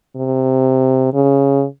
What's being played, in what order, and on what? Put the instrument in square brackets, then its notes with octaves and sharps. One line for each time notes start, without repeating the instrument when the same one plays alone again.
[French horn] C3
C#3